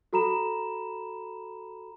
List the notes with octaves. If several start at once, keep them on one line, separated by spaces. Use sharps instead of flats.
F#4 A4 A#5 B5 E7